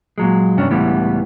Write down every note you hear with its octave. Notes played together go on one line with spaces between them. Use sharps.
A#2 F#3 G#3
E2 G2 C3 C#4 D4
C#2 A2 E3 G3 B3